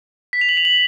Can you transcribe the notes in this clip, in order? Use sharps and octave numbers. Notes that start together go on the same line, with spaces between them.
B6
F7
F#7
F7
F#7